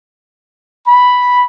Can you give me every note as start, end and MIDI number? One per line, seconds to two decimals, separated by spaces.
0.88 1.45 83